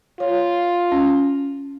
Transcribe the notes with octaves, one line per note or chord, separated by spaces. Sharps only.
F4 C#5
C#4